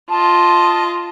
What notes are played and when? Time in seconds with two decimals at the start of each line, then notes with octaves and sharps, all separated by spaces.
0.11 F4 D#5 A5